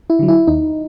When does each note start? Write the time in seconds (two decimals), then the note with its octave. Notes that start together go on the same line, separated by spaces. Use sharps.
0.10 E4
0.19 D3 F#3
0.28 E4
0.47 D#2 D#4